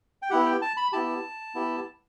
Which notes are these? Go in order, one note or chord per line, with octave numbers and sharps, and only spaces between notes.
G5
B3 E4 G4 F#5
G5
A5
B5
B3 E4 G4 A5
B3 E4 G4